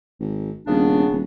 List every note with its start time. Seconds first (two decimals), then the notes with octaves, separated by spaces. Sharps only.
0.20 G#1
0.67 D#1 C#3 B3 D4
1.11 D#1